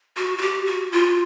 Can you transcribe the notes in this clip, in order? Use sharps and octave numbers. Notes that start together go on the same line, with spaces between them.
F#4
F#4
G4
F#4
F4